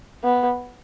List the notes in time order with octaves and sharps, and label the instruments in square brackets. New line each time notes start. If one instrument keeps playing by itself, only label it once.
[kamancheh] B3